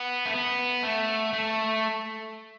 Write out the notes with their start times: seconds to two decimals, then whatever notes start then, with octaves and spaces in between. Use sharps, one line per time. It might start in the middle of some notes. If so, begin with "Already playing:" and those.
Already playing: B3
0.25 A3
0.33 B3
0.83 A3
1.33 A3